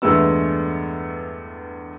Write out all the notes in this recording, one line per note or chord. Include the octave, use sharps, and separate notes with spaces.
E2 G2 G#3 A3 B3 E6